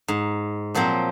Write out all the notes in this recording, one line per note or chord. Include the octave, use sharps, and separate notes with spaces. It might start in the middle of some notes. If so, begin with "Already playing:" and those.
G#2
A#2 F3 F#3 C4